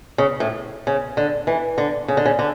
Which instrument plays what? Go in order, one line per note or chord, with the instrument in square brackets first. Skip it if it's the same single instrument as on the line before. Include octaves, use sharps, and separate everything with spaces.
[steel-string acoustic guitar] C#3
A2
C#3
D3
E3
D3
C#3
D3
C#3
D3